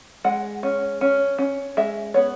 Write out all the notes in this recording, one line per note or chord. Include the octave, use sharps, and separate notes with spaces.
G#3 F#5
C#4
C#4
C#4
G#3 E5
B3 C#5